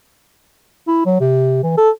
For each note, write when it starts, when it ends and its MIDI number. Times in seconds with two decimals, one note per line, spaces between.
0.87 1.04 64
1.06 1.19 54
1.20 1.59 48
1.63 1.73 52
1.77 1.90 69